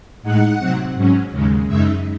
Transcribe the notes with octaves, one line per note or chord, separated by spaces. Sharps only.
A2 G#3 D#4 F#5
C3 F#3 C4
G#2 F#3 C#4
D#2 C#3 G#3
F#2 C#3 G#3 D#4 E5